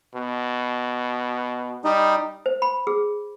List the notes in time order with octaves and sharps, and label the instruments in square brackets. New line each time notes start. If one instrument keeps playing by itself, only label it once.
[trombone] B2
[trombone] G3 [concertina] D#4
[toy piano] C5
B5
G#4